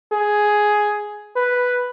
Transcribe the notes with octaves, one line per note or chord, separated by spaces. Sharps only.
G#4
B4